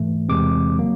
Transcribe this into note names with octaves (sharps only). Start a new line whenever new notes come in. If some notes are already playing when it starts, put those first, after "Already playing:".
Already playing: G#2 E3 A3
E2 C3 E3 G#3 C4 D6
C#3 F#3 A#3